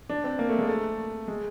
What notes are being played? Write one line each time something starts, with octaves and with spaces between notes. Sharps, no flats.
D4
C4
A#3
A3
G#3
A3
G#3